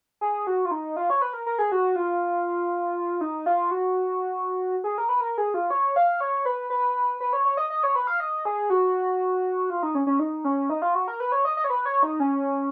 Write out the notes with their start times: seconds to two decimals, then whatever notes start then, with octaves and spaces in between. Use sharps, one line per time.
0.21 G#4
0.47 F#4
0.65 F4
0.71 D#4
0.96 F4
1.10 C#5
1.22 B4
1.33 A#4
1.46 A#4
1.59 G#4
1.72 F#4
1.96 F4
3.21 D#4
3.46 F4
3.71 F#4
4.84 G#4
4.98 A#4
5.09 B4
5.21 A#4
5.38 G#4
5.54 F4
5.70 C#5
5.96 F5
6.21 C#5
6.46 B4
6.70 B4
7.20 B4
7.33 C#5
7.45 C#5
7.57 D#5
7.70 D#5
7.83 C#5
7.95 B4
8.07 F5
8.20 D#5
8.45 G#4
8.70 F#4
9.70 F4
9.83 D#4
9.95 C#4
10.07 C#4
10.19 D#4
10.44 C#4
10.69 D#4
10.82 F4
10.94 F#4
11.08 A#4
11.20 B4
11.32 C#5
11.45 D#5
11.57 D#5
11.64 C#5
11.70 B4
11.86 C#5
12.03 D#4
12.20 C#4